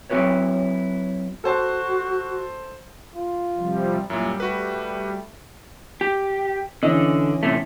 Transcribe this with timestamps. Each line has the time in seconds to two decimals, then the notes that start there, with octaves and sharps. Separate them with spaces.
0.10 F#3 C4 E4 F#4 B4 C#5
1.44 F#4 A4 C5 A5
3.16 F4
3.57 C3 F3 G3
4.10 F#2 A#2 G3 E4
4.40 A3 F#4 B4
6.01 G4
6.83 D3 E3 C#4 D#5
7.43 A2 C3 A3